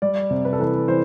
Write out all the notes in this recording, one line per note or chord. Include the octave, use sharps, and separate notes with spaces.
G3 D5
C3
B4
A4
E3 B4
E3 C5